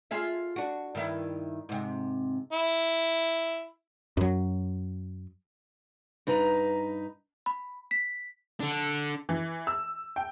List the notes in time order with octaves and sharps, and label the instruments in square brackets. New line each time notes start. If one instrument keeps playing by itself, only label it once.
[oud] F4 G#4 E5
D4 F#4
G2 D#3 E4
G#2 C3
[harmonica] E4
[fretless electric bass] F#2 F#3
[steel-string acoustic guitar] G2 D#4 B4 A#5
[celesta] B5
B6
[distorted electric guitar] D3 D4
[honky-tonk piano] E3
E6
G5